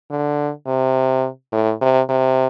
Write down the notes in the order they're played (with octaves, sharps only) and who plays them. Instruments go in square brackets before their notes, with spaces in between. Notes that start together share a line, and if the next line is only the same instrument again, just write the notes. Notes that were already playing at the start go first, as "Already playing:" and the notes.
[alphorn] D3
C3
A2
C3
C3